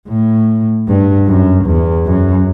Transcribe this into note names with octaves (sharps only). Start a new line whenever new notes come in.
A2
G2
F#2
E2
F#2